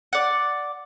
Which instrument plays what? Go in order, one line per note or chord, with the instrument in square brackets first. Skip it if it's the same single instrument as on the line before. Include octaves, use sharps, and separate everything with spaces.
[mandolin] D5 F#5